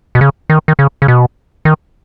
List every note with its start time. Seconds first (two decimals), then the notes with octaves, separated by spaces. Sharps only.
0.15 B2
0.21 C#3
0.50 D#3
0.68 D#3
0.79 C#3
1.02 C#3
1.08 B2
1.65 D#3